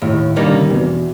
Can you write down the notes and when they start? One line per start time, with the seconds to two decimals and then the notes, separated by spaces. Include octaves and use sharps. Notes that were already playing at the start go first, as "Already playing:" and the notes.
0.02 D#2 A2
0.36 D#3 G3 A#3 D#4
0.43 D3
0.52 C#3
0.61 C3
0.70 E2 B2